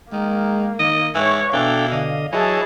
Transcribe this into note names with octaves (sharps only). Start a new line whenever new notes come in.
D#3 G#3 A#3
D#3 D#5
G#2 E3 C#5 C#6
B2 E3 D4 A4 F5 G5
D3 D#5
E3 F#3 E4 G#4 C#5 D#5 A5